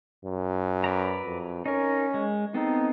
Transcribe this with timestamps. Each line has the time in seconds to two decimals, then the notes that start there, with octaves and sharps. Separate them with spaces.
0.25 F#2
0.84 B4 D5 A#5
1.26 F2
1.66 C#4 D#4 A#4
2.14 G#3
2.54 B3 C4 D#4 A4